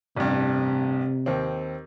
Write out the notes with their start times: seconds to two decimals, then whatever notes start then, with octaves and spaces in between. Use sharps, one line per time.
0.17 A1 G2 C3
1.26 D#2 C4